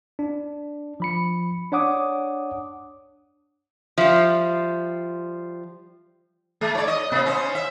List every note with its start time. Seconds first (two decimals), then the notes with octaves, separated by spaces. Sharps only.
0.19 D4
1.00 F3 B5 C#7
1.72 D4 C#5 F#5 D6 D#6
3.98 F3 G3 E5
6.61 G#3
6.75 C#5 D5
6.88 D#5
7.12 C3 B3
7.26 C#4 C5
7.55 E5